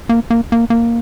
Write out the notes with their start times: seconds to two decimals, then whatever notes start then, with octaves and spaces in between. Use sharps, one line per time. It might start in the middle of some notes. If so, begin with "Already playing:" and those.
0.09 A#3
0.30 A#3
0.52 A#3
0.70 A#3